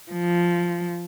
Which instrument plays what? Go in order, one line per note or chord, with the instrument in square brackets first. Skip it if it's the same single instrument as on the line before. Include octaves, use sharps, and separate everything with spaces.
[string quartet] F3